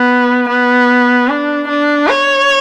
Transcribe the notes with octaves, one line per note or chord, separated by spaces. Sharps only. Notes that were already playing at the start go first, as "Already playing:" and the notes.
Already playing: B3
B3
D4
D4
C#5